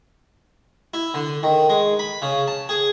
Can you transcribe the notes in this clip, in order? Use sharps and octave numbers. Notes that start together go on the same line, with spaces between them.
E4
D3
D#3
G#3
B5
C#3
A5
G#4